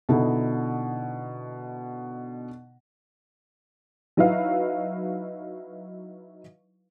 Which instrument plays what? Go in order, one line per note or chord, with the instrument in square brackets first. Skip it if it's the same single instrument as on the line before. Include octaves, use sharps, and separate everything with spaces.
[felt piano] B2 D3 D#4 E4
[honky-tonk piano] F#3 D#4 E4 B4 F5